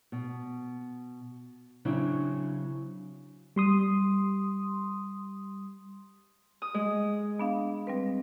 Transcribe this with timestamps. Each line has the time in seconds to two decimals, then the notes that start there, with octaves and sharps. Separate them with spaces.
0.12 B2
1.85 C#3 F#3 C4 D4 E4
3.56 G3 C6 D#6
6.62 D#6
6.74 G#3
7.40 B3 D4 F5
7.87 G3 C4 B4